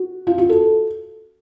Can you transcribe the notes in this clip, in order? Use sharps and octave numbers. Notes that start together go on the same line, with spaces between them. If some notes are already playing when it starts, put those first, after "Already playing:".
Already playing: F#4
F4
F#4
A4